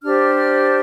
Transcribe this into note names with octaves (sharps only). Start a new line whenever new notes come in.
D4 G4 C5 F6